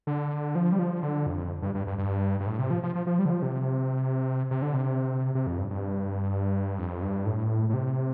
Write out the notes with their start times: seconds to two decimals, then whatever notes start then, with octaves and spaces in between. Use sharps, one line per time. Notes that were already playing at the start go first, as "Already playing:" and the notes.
0.07 D3
0.55 F3
0.72 G3
0.79 F3
1.03 D3
1.26 F2
1.62 G2
1.75 G2
1.87 G2
1.98 G2
2.40 G2
2.46 A2
2.59 C3
2.70 F3
2.83 F3
2.95 F3
3.07 F3
3.19 G3
3.25 D3
3.30 F3
3.42 C3
4.51 C3
4.62 D3
4.74 C3
5.35 C3
5.47 F2
5.58 G2
5.70 G2
6.78 F2
7.02 G2
7.26 A2
7.69 A2
7.74 C3